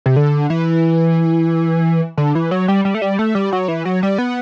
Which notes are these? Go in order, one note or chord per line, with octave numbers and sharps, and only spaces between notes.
C3
D3
E3
D3
E3
F#3
G3
G3
A3
G3
A3
G3
F#3
E3
F#3
G3
B3